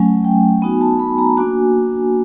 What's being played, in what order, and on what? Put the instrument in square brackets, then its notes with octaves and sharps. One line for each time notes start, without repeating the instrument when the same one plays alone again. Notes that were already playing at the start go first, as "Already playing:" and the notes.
Already playing: [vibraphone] F#3 A3 C#4 G#5
G5
B3 D#4 F#4 G#5
A5
B5
A#5
A#3 D4 F#4 G#5